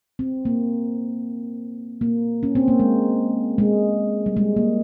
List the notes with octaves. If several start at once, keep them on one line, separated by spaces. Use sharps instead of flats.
C4
A#3
A#3
C#4
C4
A#3
G#3
G#3
G3
G#3
A#3